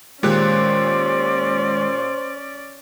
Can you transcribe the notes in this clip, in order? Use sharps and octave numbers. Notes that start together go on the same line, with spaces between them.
A#2 D#3 G#3 C#4 G4 C5 D5 F#6